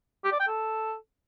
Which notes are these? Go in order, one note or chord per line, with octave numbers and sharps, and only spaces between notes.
G4
D5
G5
A4